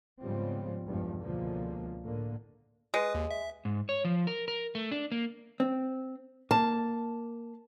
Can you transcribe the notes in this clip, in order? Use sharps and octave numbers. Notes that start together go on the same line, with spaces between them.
G#2 C#3 F3 G3 B3 C4
B1 E2 G2 B2 F3 G#3
C#2 B2 D3 F3 A#3
A2 D3 A#3
G#3 B4 D#6
D#2
E5
G#2
C#5
F3
A#4
A#4
A3
D4
A#3
C4
A#3 A5